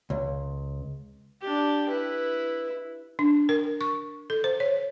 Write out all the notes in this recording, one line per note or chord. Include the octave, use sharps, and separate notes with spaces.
C#2
D4 G4
E4 B4
D4
A#4
C#6
A4
C5
C#5